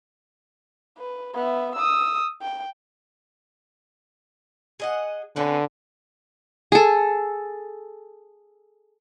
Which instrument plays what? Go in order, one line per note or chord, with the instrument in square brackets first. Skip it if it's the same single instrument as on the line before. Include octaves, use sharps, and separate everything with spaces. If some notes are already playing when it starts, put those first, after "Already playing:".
[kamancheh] B4
B3 E5
D#6 E6
G5
[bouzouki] G#4 D#5 F#5
[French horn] D3 [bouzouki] C4 C#4 B4
[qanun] G#4 A4